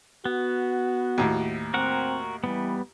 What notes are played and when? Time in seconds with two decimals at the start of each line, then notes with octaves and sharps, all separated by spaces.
0.25 B3 F#4
1.18 D#2 A2
1.74 C4 F#4 A#4 F#5
2.44 E3 G3 B3